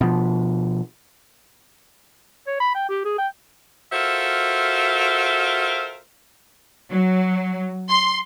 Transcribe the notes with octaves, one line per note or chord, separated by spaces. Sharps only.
B2 F3
C#5
B5
G5
G4
G#4
G5
F4 F#4 A4 A#4 C5 E5
F#3
C6